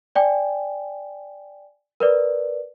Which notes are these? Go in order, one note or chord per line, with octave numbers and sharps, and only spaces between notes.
D5 G5 G#5
A#4 B4 D5